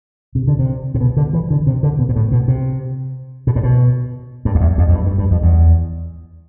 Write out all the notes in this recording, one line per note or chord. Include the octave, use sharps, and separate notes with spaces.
C3
D3
C3
C3
B2
D3
E3
D3
C3
D3
B2
B2
A2
B2
C3
B2
A2
B2
G2
F2
E2
F2
F2
G2
G2
G2
F2
E2